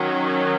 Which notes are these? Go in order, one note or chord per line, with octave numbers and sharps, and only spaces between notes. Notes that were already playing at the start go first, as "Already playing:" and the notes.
Already playing: D#3 F#3 C#4